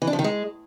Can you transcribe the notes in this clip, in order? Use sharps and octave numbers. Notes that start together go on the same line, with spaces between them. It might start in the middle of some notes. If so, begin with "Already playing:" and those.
E3
D4
F3
D#3
G#3